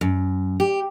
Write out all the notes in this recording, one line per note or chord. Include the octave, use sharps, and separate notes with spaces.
F#2
G4